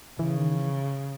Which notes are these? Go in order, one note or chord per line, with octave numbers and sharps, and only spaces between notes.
C#3 E3
D#3
E3